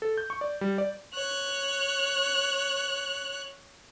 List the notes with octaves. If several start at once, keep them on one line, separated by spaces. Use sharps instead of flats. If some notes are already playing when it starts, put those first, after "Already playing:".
A4
G6
C#6
D5
G3
D5
C#5 F#6